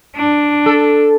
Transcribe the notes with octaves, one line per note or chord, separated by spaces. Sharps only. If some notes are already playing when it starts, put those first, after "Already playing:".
D4
A4